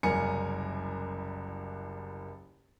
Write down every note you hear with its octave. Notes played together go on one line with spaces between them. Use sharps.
F#1 C2 A#4 G#5 A#5 C#7